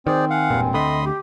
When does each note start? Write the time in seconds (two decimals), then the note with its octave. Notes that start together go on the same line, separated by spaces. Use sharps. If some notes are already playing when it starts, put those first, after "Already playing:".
0.07 D#3 C4 G#4 C5 D5
0.30 F5 F#5 G#5
0.50 E1 G2 A#2
0.74 D2 D3 A3 D#5 B5 C6 D#6
1.05 G4